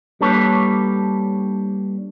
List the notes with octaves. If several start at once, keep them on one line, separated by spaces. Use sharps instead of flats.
G3 A#3 D4 A4 B4 C#5